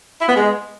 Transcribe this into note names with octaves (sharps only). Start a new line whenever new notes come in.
E4
B3
G#3